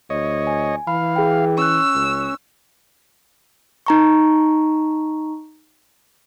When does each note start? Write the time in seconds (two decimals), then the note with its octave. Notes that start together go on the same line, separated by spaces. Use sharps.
0.10 D2 C#5 D#5
0.47 G#5
0.87 E3 F5 B5
1.16 G#4 G5
1.58 C#4 C#6 E6 F#6
1.95 C#2
3.86 D#4 A#5 C#6